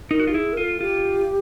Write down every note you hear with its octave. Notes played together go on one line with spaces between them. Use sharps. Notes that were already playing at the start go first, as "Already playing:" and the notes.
D#4 A#4
F#4
F4 G4
E4 G#4
A#4
F4 A4
F4 G4